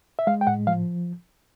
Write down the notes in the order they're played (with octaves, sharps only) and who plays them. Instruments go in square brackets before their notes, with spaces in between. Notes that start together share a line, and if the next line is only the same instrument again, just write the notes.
[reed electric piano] E5
G#3 F5
G5
A2 F#5
F3 F5